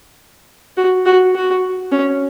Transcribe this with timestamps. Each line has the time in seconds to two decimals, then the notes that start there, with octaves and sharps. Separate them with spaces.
0.77 F#4
1.06 F#4
1.35 F#4
1.92 C#4